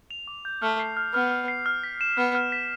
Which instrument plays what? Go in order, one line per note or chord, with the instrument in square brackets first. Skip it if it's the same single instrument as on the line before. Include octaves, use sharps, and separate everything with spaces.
[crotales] F7
D6
G6
[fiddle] A3 [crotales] F6
[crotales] C7
F6
[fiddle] B3 [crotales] F6
[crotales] F6
C7
F6
B6
E7
[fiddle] B3 [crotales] F6
[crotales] F6
B6